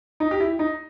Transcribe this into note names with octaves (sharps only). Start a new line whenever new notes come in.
D#4
G4
E4
D#4